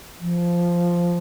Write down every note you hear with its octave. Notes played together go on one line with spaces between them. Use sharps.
F3